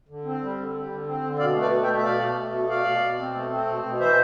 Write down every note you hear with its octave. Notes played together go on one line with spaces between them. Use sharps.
D3
C4
G3
D3
G3
D3
C4
D3
B2 D5 F5
A3
B4 D5
B2
E5 G5
A3
E5
B2 D5 F5
B2
A3
B2
B2 D5 F5
B2
B2
C4
A3
C4
B2
B2
E3 C5 E5